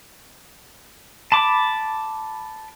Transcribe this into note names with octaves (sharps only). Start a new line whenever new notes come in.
A5 B5 D6